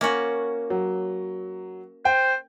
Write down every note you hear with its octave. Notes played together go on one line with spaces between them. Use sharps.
A#3 C#4 F#4
F#3
C5 G5